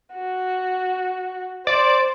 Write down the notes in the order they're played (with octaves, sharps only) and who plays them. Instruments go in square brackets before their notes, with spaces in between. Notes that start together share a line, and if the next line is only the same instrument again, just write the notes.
[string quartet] F#4
[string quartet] C5 [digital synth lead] D5